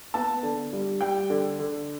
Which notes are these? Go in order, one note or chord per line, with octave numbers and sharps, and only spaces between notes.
B3 A5
D3
G3
G3 G5
D3
D3